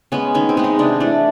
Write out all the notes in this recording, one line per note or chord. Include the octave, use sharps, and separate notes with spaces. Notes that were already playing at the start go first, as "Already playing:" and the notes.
G#3 B3 C#4
D#3 C#4
C4
G#3 B3
D#4
C3 D4
E3 A3 D4